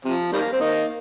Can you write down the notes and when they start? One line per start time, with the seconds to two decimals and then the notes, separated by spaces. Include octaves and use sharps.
0.05 C3 F3
0.33 D#3 G3 A#3
0.52 C4
0.60 A#3 D#4